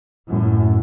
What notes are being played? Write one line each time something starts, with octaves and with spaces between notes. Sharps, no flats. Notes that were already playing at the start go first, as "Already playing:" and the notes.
F#2 A2